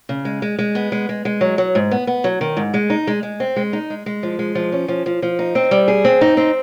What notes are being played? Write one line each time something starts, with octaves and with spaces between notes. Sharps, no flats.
C#3
G#3
G#3
G#3
B3
G#3
G#3
G#3
F#3
F#3
G#2
B3
B3
F#3
D#3
G#2
G#3
D#4
G#3
G#3
C4
G#3
D#4
G#3
G#3
F3
G#3
F3
C#4
F3
F3
F3
D#4
C4
G3
G#4
C4
D#4
C4